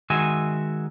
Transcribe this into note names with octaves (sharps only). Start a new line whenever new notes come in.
D#3 G#3 F#4 E5 G#5